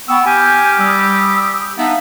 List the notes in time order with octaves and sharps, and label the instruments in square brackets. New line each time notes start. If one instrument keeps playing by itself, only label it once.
[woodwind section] B3 [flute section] G5 B5 C#6 [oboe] E6
[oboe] G4 [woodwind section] G#5 [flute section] F6 G6
[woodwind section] G3 [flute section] D#6 E6
[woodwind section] B3 D4 D#4 [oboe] E5 [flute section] F5